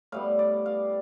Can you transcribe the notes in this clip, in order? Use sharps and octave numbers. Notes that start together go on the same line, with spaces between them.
A2 G3 B3 F5
D5
F5